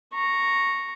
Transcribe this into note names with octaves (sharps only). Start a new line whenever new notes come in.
A#5 C#6